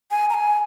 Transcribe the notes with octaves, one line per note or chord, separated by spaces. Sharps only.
G#5
A#5
G#5